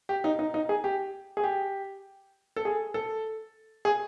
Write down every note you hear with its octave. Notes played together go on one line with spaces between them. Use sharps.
G4
D#4
D#4
D#4
G#4
G4
G#4
G4
A4
G#4
A4
G#4